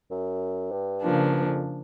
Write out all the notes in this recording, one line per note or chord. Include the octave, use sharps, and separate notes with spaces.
F#2
G2
C#3 F3 A#3 D4
G2
F2